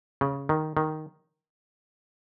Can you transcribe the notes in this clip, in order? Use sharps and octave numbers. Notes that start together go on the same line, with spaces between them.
C#3
D#3
D#3